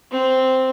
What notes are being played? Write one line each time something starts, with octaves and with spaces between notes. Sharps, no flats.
C4